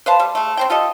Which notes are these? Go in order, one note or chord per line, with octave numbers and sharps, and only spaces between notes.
B4 C5 F5 A5
G3
G#3 A3
C4 C5 G5
F4 G4 A4 D#5